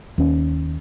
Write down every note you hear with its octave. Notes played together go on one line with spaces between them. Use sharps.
D#2 C#4